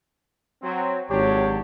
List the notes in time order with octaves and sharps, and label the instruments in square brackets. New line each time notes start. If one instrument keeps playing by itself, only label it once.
[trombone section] F#3 C4
[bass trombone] G#1 [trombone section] F#3 D4 G4 [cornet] C#5